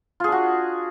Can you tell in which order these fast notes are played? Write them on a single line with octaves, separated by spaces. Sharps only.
F4 G#4 D4 F#4